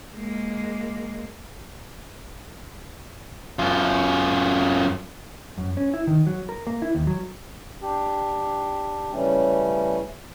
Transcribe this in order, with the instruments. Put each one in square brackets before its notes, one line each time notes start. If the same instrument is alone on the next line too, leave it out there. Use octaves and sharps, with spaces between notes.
[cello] G#3 A#3
[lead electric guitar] F#2 F4
[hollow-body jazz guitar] F#2
C#4
E4
D#3
F#3
A#4
A#3
E4
D#2
F#3
[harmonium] D4 G4
C#3 E3 G3 A3 C#4